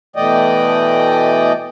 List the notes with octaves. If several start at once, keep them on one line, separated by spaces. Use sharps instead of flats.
B2 E3 A3 D5 D#5 G5